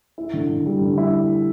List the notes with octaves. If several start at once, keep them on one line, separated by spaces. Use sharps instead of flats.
E4
D3
D3
G3
D3
E4